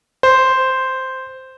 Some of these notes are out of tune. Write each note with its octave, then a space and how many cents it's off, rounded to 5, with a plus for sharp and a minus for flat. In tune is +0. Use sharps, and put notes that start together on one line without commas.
C5 -5